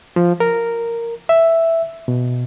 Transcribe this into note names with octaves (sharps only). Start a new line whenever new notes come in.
F3
A#4
E5
B2